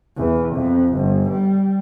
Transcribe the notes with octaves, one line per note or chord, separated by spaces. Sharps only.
E2
F2
G1
G3